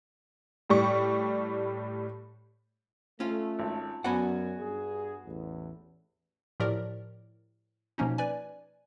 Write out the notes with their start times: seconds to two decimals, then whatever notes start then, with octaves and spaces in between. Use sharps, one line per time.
0.70 A2 G3 C#6
3.20 A3 C#4 F4
3.59 G#1
4.04 F#2 B3 F#4 D5 F#5 G#5
4.58 G2 G#4
5.25 A1 E2
6.60 A2 F3 G4 A#4 D5
7.98 B2 F3 A#3 C#4 D#4
8.18 B4 D5 G#5